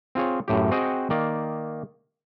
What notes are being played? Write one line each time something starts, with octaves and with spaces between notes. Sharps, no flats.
C4 F4 G#4 C#5
F#2 A2 G4
C4 F#4 G#4 D#5 F#5 G5
D#3 A#3 D5